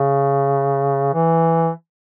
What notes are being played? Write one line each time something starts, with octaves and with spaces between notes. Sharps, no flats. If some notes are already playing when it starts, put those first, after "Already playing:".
Already playing: C#3
E3